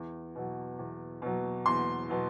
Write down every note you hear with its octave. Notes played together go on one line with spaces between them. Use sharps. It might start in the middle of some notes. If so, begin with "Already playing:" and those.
Already playing: E2
B2 F#3
E2
B2 F#3
E2 C6
B2 F#3